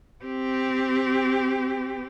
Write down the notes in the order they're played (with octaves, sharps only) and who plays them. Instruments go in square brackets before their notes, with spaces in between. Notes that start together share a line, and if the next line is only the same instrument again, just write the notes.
[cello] C4 G4